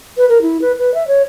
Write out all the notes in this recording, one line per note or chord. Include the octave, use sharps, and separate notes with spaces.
B4
A#4
E4
B4
B4
E5
C#5